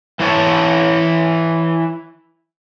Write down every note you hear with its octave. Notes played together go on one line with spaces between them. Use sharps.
E3 E4 C#5 E5 A5